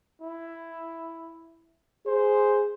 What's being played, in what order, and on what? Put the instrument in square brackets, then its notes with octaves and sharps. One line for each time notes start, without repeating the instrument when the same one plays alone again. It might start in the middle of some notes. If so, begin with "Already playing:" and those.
[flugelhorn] E4
[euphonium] G#4 [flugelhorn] C5